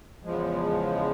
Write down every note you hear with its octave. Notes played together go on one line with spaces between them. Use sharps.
E2 C#3 F3 G#3